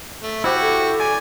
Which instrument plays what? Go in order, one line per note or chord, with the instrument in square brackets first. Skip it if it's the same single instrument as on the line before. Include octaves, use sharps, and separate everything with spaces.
[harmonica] A3
[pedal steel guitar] E4 G4 [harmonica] F#4 C#6 [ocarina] C5
[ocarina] A4
[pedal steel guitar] D5 [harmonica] G#5